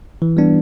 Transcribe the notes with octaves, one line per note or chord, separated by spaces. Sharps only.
E3
G3 B3 D4